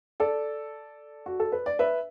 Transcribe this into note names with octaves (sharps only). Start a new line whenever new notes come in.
A4 D5
F#4
A4
B4
D5
B4 E5